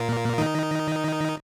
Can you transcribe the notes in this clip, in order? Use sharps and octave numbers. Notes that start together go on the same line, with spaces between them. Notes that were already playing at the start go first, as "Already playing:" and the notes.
Already playing: A#2 A#3
D#3 D#4